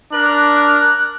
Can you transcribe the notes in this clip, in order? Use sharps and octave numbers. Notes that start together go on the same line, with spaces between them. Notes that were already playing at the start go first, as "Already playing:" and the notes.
D4 A#4 F#6